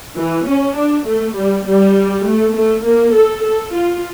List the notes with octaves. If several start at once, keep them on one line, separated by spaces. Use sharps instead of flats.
E3
C#4
D4
A3
G3
G3
A3
A3
A#3
A4
A4
F4